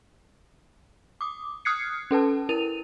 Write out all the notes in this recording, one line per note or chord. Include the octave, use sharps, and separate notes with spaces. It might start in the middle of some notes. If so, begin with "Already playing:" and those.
D6 D#6
D#6 F6 F#6 G#6 C7 C#7
C#4 A4 B4 A5
E4 A#4 D#7 F7